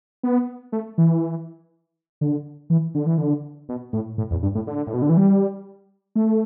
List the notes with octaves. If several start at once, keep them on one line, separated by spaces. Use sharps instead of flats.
B3
A3
E3
D3
E3
D3
E3
D3
B2
A2
A2
E2
G2
A2
D3
A2
B2
D3
E3
G3
A3